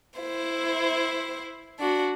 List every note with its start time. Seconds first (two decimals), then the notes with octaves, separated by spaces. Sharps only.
0.19 E4 C5
1.79 D4 F#4